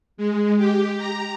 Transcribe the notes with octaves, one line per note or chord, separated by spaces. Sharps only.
G#3
G4
A#5